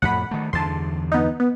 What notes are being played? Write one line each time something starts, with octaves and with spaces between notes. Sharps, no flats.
F2 A2 F#5 B5
D#3 A3
E2 G2 D3 A5 C6
B3 D#4
B3